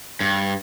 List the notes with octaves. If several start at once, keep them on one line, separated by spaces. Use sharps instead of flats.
G2